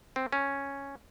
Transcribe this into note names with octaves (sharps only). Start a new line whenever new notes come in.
C4
C#4